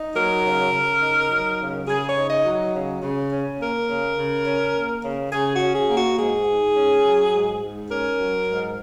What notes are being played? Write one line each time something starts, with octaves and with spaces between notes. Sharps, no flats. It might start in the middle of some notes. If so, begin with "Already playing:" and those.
Already playing: D#4
F#3 A#4
C#3
C#3
D#4
F#3
C#3
C#3 G#4
C#5
D#4
D#5
F#3
C#3
C#3
C#4
A#3 A#4
C#3
C#3
C#4
A#3
C#3
C#3 G#4
F#4
C#4
G#4
A#3
F#4
G#2 G#4
G#2
C#4
F#3
G#2
G#2
C#4 A#4
F#3
G#2